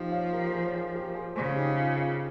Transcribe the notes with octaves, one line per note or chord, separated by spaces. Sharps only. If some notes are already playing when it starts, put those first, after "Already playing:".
Already playing: F3 D#4 F4 G4
C#5 F5
G4 A#4
G#4 C5
C#5
G#4 C5
G4 A#4
G#4 C5
C#3 G#4 C5
D#4 G4
F4
F4 G#4